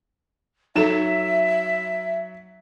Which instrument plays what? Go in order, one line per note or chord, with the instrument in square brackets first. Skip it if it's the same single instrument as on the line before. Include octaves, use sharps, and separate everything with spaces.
[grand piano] F#3 E7 [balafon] D#4 A4 [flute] E5